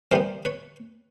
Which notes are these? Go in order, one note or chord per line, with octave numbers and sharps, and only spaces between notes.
C3 E3 G3 B3 A#4 C5
B4 C#5